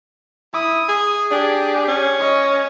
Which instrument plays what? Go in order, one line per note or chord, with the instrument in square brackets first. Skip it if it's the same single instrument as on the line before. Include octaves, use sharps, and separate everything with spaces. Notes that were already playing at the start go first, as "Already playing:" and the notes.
[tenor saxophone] E4 [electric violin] D#6
[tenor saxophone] G#4
[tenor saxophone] D4 [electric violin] G4 G#4
[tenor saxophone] C#4
[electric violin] C#5 D#5